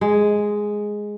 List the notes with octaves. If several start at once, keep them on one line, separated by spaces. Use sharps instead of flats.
G#3